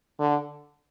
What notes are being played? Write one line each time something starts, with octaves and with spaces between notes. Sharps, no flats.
D3